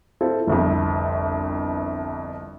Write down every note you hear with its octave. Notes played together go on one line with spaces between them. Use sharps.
C4 E4 F4 A4
G1 C2 F2